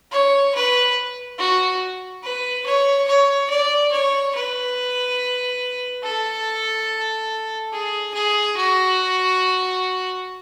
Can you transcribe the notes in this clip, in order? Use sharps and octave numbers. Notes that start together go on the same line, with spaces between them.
C#5
B4
F#4
B4
C#5
C#5
D5
C#5
B4
A4
G#4
G#4
F#4